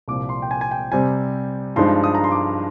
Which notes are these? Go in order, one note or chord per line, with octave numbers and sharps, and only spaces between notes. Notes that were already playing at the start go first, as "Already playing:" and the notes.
C2 A#2 F3 D6
C6
G5
G#5
G#5
G5
C3 G3 C4 G#5
G2 F3 G#3 D#4 C6
D#6
A#5
C6
D6